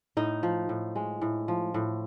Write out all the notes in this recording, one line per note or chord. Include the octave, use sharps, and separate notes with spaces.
A2 D#4
F3
A2
G#3
A2
F3
A2